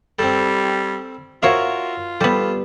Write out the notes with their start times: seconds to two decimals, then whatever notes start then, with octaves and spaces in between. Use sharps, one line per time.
0.19 G3 C4 A4
1.43 F4 F#4 A#4 C#5 E5 F5
2.21 G3 B3 A4